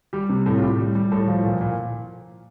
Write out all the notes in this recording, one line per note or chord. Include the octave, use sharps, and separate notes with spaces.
G3 G4
C3
A2 A4
F4
A2 G4
G3
G3
A2 A4
F3
A#2
A#2